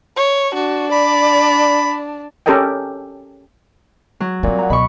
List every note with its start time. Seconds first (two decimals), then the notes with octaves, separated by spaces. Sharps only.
0.16 C#5
0.54 D4 F#4
0.92 D5 B5
2.46 C#4 G4 A4 A#4 D#5 G5
4.20 F#3
4.43 A#2 G3 C4
4.59 F#5 A#5
4.70 C#2 B2 G#3 D#5 B5 C#6